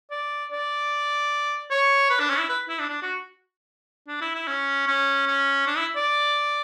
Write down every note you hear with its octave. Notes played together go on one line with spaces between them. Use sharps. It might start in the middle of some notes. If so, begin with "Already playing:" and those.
D5
D5
C#5
B4
D4
C#4
E4
B4
E4
D4
D4
F#4
D4
E4
E4
C#4
C#4
C#4
D4
E4
D5